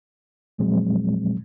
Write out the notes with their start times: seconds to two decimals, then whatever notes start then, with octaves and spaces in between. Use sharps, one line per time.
0.58 E2 A#2 F3 F#3 G#3 C4